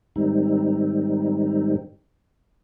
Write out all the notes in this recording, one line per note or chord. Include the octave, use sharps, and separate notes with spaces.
G#2 D#3 G3 C4 D#4